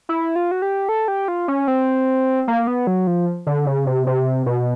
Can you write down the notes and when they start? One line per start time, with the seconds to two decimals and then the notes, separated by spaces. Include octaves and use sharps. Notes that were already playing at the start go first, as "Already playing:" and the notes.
0.09 E4
0.36 F4
0.51 F#4
0.62 G4
0.89 A4
1.08 G4
1.28 F4
1.48 C#4
1.68 C4
2.48 A#3
2.67 B3
2.87 F#3
3.07 F3
3.47 D3
3.66 C#3
3.87 C3
4.07 C3
4.46 B2